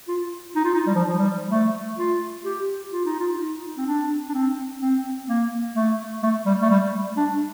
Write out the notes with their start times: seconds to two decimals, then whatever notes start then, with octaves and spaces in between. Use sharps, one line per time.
0.08 F4
0.56 D#4
0.65 F4
0.74 D#4
0.87 G3
0.95 F3
1.09 F3
1.19 G3
1.50 A3
1.98 F4
2.45 G4
2.92 F4
3.06 D#4
3.19 F4
3.40 D#4
3.77 C4
3.87 D4
4.29 D4
4.34 C4
4.81 C4
5.29 A#3
5.75 A3
6.23 A3
6.46 G3
6.62 A3
6.70 G3
7.17 D4